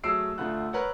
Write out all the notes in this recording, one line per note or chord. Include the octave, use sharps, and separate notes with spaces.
F#3 A3 G#4 E6 C7 D7
D2 D3 A3 F4 F#5 F#6
A#4 B4 C#5 F#5